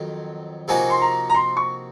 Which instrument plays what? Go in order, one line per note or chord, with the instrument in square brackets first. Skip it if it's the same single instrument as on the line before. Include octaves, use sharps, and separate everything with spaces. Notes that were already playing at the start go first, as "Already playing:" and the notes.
Already playing: [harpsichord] F2 D#3 F#3 F4
[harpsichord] C3 F3 A#3 D#4 F#4 [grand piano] G#5
[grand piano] C6
A#5
A#5
C6
C#6